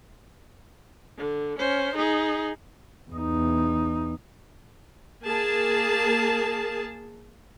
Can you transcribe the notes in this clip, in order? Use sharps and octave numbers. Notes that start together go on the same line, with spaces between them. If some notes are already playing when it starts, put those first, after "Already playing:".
D3
C#4 C5
D#4 G#4
E2 D#4
A#3 G#4 A5